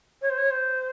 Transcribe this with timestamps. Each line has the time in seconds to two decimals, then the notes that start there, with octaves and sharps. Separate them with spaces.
0.22 C#5
0.30 C5
0.37 C#5
0.50 C5